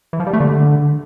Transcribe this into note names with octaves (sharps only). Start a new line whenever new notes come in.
E3
F3
G3
A3
D3